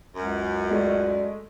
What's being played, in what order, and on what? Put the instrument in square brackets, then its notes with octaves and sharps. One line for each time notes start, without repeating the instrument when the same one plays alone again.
[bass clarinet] C#2 [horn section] F#2
[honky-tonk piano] G#3 A3 [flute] D5